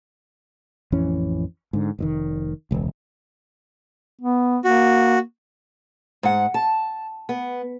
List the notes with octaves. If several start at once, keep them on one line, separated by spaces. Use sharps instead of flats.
A1 F2 E3 C#4
G#2 D3
F1 A#2 D#3
E1 C#2
B3
A#3 F#4
G#2 F#5
A5
B3